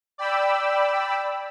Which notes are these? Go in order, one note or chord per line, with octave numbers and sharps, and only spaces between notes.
D5 G5 B5 E6